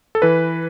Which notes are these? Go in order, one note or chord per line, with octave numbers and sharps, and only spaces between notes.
A4
E3 B4